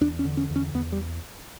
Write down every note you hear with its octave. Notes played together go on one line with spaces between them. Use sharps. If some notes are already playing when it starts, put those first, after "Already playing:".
E2 D4
C#4
D3
C#4
E2
C#4
E2 B3
G3